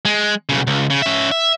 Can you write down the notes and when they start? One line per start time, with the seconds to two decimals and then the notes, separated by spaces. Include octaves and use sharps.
0.05 G#3
0.49 B1 C#3
0.67 C#2
0.90 C#3
1.02 C#4 E5
1.32 E5